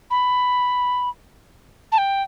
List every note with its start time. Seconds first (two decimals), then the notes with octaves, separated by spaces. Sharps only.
0.10 B5
1.92 A5
1.98 G5